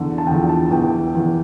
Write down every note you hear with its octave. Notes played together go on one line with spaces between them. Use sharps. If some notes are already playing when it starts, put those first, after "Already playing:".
Already playing: E2 D3
A5
E2 D3 F3 G5
A5
E2 E3 G5
E2 E3